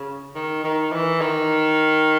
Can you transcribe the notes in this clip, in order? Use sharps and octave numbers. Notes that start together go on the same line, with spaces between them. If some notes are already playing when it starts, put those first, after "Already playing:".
Already playing: C#3
D#3
D#3
E3
D#3